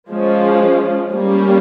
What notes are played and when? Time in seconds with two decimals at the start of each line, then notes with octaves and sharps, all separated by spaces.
0.10 F3 G#3 C#4 F4
1.12 G3 A#3 C#4